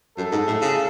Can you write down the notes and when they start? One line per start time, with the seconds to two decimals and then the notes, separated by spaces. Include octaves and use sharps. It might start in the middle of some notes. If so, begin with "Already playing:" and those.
0.17 F#2 A4
0.32 G#2
0.47 A2
0.61 C#3